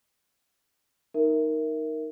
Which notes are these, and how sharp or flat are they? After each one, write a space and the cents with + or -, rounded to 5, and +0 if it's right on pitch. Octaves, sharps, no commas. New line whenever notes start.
D#4 +0 A#4 +0 E5 +0